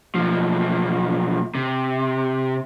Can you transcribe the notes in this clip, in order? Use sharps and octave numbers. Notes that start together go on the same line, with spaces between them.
B1 F3
C3